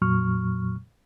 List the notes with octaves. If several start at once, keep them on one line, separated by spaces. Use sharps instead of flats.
F2 A#2 F#3 C#6 F6